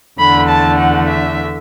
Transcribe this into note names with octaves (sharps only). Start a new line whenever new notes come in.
E2 D3 A3 B5
A5
F#5
E5